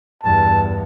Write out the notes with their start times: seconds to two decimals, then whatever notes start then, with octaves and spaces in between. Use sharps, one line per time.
0.23 E2 G2 A5